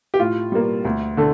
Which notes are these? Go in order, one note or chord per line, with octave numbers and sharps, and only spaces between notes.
G4
A2 F4
G3 A#3
D2
D3 A3